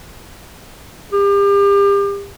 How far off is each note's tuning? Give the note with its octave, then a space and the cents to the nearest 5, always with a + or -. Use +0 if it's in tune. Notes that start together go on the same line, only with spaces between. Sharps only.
G4 +35